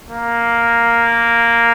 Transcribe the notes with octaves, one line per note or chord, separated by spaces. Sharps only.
A#3